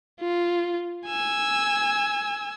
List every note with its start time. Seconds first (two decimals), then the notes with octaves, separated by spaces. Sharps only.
0.21 F4
1.07 G#5 E6